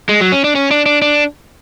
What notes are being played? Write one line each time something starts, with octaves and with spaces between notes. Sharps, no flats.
G#3
F#3
C#4
D4
C#4
D4
D4
D4